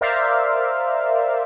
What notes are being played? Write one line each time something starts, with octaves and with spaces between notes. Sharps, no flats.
A#4 C5 D5 E5 F5